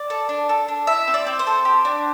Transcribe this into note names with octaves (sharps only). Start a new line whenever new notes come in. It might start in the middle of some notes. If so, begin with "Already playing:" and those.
Already playing: D5
A4
D4
A4
D4
E4 E5
C4
D5
C4
C5
A4
G4
D4